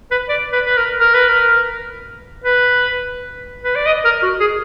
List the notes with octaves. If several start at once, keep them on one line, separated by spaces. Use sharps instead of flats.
B4
D5
B4
B4
A#4
A#4
B4
A#4
B4
B4
D5
D#5
A#4
F#4
G#4